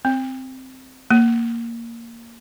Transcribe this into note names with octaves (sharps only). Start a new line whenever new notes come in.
C4
A#3